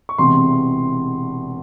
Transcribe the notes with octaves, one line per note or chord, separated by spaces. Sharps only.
C#6
E1 E2 C3 C6